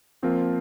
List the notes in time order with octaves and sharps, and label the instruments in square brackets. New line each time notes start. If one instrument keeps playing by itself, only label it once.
[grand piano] F3 A#3 F4 [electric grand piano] C4